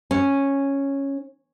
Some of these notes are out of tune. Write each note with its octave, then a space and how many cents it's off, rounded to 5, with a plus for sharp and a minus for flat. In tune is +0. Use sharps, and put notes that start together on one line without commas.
C#4 -5